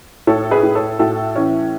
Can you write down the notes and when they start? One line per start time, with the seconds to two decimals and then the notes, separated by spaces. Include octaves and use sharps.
0.27 A2 A4 C#5
0.51 G#4 B4
0.63 A2
0.75 A4 C#5
0.99 A2 F#4 A4
1.36 E3 C#4